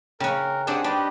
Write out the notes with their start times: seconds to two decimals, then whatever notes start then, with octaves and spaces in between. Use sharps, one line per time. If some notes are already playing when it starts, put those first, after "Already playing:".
0.20 C#3 C#4 A#4 G5 F#6
0.67 C4 D4 G4 G#4 F#5 D#6
0.84 D4 G4 B4 D#5